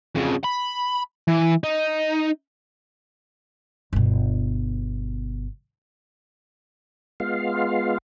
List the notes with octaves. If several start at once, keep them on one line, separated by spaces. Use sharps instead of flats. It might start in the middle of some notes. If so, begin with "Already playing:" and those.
F2 C#3
B5
E3
D#4
G1 B2
G#3 B3 F4 F5